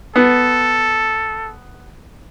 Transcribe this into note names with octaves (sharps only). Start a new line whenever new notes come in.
B3 A4